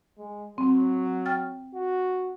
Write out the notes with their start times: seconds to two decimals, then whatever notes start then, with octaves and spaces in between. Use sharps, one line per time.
0.18 G#3
0.58 F#3 C4
1.26 G5 F6 A6
1.74 F#4